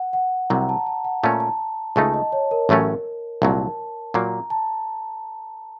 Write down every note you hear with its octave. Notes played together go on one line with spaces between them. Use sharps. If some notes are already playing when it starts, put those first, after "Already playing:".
Already playing: F#5
F#5
C2 C3 F#3 A#5
A5
A5
F#5
A#2 A3 C#4 A5
A#5
A5
C#2 C#3 A3 D#4 A5
D#5
C#5
A#4
A1 A2 F#3 A3 C#4
C2 A#2 F#3 A5
A#2 F#3 A#3 A#5
A5